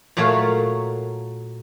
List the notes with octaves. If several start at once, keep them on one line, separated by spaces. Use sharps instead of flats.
A#2 F#3 A3 A#4 C#5 F5